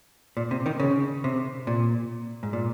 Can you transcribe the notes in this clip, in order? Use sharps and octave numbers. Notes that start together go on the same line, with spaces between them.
A#2
C3
D#3
C#3
C3
A#2
G#2
A#2